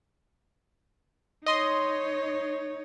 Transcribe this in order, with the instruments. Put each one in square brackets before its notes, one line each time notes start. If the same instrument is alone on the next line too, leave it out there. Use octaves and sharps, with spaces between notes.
[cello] D#4 C#5 [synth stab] D#5 C6